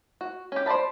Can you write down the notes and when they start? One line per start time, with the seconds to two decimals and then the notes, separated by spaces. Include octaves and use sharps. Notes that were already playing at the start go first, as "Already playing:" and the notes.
0.21 F#4
0.52 C#4 G4
0.66 C5 D5 D#5 A5 B5